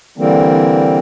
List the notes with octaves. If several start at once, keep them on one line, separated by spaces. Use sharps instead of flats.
D3 E3 G3 A#3 C4